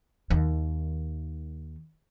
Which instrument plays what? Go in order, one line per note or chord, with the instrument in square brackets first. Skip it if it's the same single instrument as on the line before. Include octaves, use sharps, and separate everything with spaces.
[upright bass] D#2 D#3